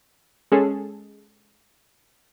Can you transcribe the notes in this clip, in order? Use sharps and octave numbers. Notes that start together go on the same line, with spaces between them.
G#3 C#4 G#4 A4